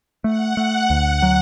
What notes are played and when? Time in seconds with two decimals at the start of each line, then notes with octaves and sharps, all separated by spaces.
0.24 A3 F#5
0.57 A3
0.90 D2
1.22 F#3